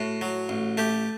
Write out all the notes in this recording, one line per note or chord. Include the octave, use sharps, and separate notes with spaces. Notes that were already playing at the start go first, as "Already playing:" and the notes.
Already playing: A2 F#4
F#3
A1
A3 G4